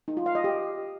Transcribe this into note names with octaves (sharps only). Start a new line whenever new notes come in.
D#4
F4
F5
D#5
G4